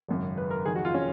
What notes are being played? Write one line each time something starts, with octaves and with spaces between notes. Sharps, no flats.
G#1 F#2 C#3
B4
A#4
F#1 F2 D#3 G#4
F#4
F4
C#4